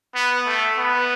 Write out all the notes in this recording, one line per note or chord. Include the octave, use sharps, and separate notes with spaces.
B3
A3
B3